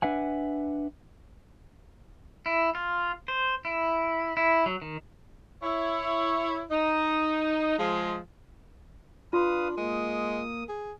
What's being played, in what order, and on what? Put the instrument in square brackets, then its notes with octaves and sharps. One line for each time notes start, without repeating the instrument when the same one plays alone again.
[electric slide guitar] D4 B4 E5 F#5 G#5
[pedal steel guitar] E4
F4
C5
E4
E4
F#3
D#3
[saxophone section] E4 C#5
D#4
F3 G#3
[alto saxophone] D4 [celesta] F4 C6 [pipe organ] B4 F5 D#6
[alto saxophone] G#3 [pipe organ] A#3 D#6
[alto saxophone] G#4